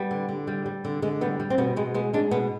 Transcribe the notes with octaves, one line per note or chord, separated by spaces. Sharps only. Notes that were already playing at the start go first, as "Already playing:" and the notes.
Already playing: G3 B3
D3
D3
G3
G3
D3
D3 G#3
G3 B3
G3
C4
B2 B3
B2 G#3
G#3 B3
G#3 D4
B2 B3